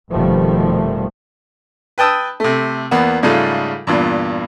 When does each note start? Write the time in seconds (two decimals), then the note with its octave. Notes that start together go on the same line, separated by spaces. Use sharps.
0.11 F1 B2 D#3 F3 G3 A3
1.98 B4 G5 A5 D#6 E6
2.40 C3 A3
2.91 E2 A#3 B3
3.23 G#2 C#3 G3 A3 F4
3.87 E2 G2 A#2